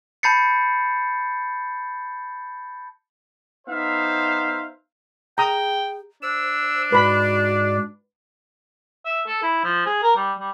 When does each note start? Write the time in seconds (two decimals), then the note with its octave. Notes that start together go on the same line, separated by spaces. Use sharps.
0.23 A5 B5 G6 A6 C7 C#7
3.67 B3 D#4 C5 E5 F5
5.38 G#4 G5 A#5 D#6
6.23 D4 C5 E6
6.92 G#2 F#4 B4 D5 B5
9.05 E5
9.27 A4
9.43 E4
9.64 F3
9.86 G#4
10.03 A#4
10.16 G3
10.40 G3